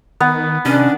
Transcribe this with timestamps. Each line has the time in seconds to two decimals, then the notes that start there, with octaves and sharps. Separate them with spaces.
0.20 D#3 B3
0.65 C3 D#3 C#4 D4